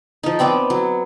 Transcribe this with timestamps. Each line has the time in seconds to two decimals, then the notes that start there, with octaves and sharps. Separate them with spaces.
0.23 F3 D#4
0.39 B3 C4 D5 G5
0.70 F#3